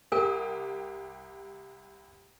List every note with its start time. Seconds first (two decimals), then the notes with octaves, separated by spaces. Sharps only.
0.12 C2 G4 A#4 G#5 D#6